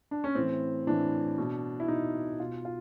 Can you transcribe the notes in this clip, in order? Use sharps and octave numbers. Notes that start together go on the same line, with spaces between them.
D4
C#4
A2 E3 C4
A2 E3 D4
B2
E4
B2 D#4
B2 F4
F4